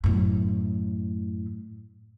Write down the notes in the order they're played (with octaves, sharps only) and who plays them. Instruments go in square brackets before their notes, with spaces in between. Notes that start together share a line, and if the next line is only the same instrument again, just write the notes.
[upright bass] F#2 A2